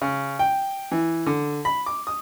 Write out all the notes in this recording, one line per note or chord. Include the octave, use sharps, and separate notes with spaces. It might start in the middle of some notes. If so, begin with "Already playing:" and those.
C#3
G5
E3
D3
B5
D6
D#6